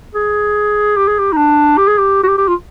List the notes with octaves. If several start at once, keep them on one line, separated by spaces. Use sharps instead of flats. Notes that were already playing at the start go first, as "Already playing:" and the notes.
G#4
G4
G#4
G4
D#4
D4
G4
G#4
G4
F#4
G4
G4
F4